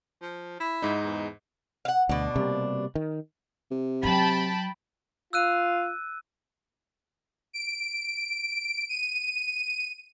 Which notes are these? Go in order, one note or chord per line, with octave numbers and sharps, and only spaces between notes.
F3
E4
G#2 D#4
E2
F5 F#5
D2 B2 D4
C3 G3 A#3
D#3
C3
F#3 G5 A5 B5
F4 E6 F#6 D#7
D7
D#7